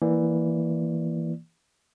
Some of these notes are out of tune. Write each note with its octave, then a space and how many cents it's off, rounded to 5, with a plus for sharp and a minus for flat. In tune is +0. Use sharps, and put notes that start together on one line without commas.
E3 +0 A#3 +0 D5 +0